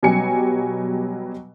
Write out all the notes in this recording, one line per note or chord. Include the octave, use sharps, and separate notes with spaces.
B2 F#3 G3 G4 G#5 C#7